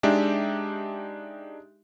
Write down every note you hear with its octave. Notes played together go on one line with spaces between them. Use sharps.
G#3 D4 D#4 G4 E5